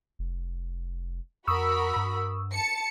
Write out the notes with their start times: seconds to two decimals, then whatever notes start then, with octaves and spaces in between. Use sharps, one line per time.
0.19 F1
1.47 F2 F#4 A#4 B5 C#6 D#6 E6
1.96 G2
2.52 A5 C#7